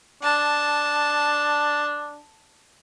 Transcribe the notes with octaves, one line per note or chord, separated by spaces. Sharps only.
D4 A5